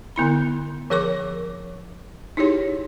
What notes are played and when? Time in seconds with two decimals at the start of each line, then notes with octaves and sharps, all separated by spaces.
0.16 D3 B3 E4 B5
0.90 F3 G#4 A#4 C#5 C#6 D6
2.37 D#4 E4 G4 G#4 C#5